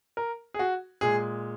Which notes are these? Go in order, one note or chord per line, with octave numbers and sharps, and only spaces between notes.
A#4
G#4
F#4
A#2 G#3 G#4